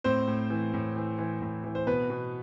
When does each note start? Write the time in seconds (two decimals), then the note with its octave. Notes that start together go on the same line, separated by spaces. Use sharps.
0.04 A2 C4 C5
0.27 A2
0.50 E3
0.74 A2
0.96 E3
1.18 E3
1.42 A2
1.64 E3
1.75 C5
1.87 B2 B3 B4
2.10 B2